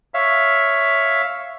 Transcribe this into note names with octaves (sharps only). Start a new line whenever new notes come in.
C#5 E5 F5